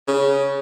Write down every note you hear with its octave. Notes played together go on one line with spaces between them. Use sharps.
C#3